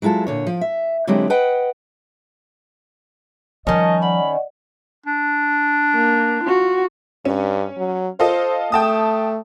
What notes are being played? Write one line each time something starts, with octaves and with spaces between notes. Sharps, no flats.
F#3 G#3 E4 F4 A4
A#2 D3 C#5
F3
E5
D3 F#3 G#3 C4 E4 G4
B4 D#5 F#5 G5
D#3 F3 G3 C#4 D#5 A5
D5 D#5 F#5 B5
D4
A#3
F4 F#4
G2 C#4
F#3
F4 A4 C5 D#5
A3 G5 A5 D#6